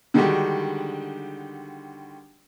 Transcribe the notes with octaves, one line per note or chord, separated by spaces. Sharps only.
D3 D#3 G3 G#3 F#4 G4